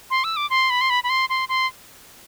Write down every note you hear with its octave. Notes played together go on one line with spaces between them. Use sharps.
C6
E6
D6
C6
B5
C6
B5
B5
C6
C6
C6